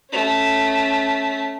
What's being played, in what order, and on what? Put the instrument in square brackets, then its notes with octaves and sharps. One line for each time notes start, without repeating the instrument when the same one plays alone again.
[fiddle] A3 C#4